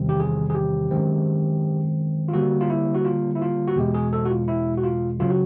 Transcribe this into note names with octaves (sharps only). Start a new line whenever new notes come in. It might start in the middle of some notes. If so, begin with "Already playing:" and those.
Already playing: E2 C3 D#3 G3 C4
G4
G#4
G#4
G4
F#2 D#3 G#3 C4
F4
D3 G3 A#3 F#4
F4
E4
F#4
F4
E4
F4
F#4
E2 B2 G#3 G4
G#4
A4
F#4
F4
E4
F#4
F4
F#2 C#3 F#3 F4
F#4